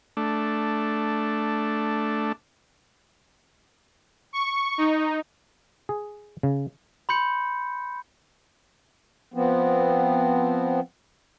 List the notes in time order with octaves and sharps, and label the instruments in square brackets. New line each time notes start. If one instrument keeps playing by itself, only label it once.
[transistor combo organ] A3 D4
[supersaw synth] C#6
D#4
[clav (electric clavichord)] G#4
C#3
[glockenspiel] B5 C6 G6 C#7
[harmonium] F3 B3 C4